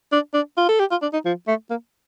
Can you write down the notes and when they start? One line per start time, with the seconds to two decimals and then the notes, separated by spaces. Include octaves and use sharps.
0.12 D4
0.34 D4
0.57 F4
0.69 A4
0.80 G4
0.91 F4
1.02 D4
1.13 D#4
1.25 F3
1.47 A3
1.70 A#3